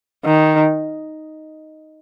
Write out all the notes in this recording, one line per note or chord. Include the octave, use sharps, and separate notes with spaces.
D#3